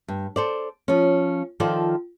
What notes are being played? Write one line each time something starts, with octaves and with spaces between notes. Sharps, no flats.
G2
A4 C5 D5
F3 C#4
D#3 F3 F4 A4 C5 D5